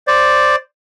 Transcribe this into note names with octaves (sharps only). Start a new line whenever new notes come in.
C5 D5